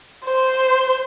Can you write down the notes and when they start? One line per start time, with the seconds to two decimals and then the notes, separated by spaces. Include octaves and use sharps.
0.26 C5